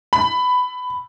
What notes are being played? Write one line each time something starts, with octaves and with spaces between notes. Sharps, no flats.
B5